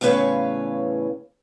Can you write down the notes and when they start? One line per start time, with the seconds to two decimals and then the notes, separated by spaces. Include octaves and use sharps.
0.01 E2 A2 C#3 B4 C#5 F5